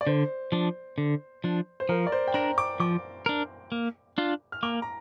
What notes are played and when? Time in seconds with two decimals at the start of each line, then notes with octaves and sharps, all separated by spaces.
0.01 D5
0.07 D3 C5
0.52 F3 D4
0.98 D3
1.44 F3 D4
1.80 C5
1.89 F3 A#4
2.07 D5
2.12 C5
2.28 G5
2.34 D4 A#4 A#5
2.58 D6
2.80 F3 D6
3.26 D4 A#4
3.72 A#3
4.18 D4 F4
4.52 F6
4.63 A#3 D6
4.82 A#5